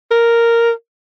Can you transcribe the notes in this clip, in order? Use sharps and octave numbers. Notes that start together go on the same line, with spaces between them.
A#4